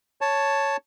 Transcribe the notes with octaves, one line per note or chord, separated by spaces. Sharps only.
C#5 A5